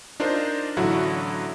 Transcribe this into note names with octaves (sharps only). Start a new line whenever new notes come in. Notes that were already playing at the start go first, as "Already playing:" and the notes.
D4 D#4 F4 A#4 C5
A1 D3 F#3 E4 F#4